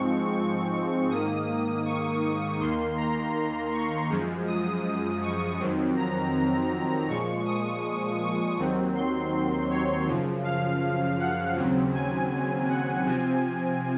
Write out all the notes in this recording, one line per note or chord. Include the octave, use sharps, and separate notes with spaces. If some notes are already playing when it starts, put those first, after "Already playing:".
Already playing: G#2 F3 G#3 C4 C#6
C#6
G#2 D#3 A#3 D#6
C#6
D#2 D#3 A#3 C6
A#5
C#6
F#2 F3 G#3
D#6
C#6
F2 D#3 F#3 C4
A#5
A#2 F3 G#3 C#6
D#6
C#6
D#2 D#3 F#3 C4
C6
C#5
F#2 C#3 F3
F5
F#5
D#2 C#3 F#3 C4
G#5
F#5
C3 F3 C4 G#5